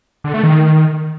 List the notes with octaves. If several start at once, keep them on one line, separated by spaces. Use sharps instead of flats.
D3
A3
D#3